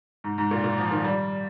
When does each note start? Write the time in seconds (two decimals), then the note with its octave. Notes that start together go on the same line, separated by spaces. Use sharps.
0.24 G#2
0.38 G#2
0.51 A#2
0.64 A#2
0.78 F3
0.91 D#3
1.05 G3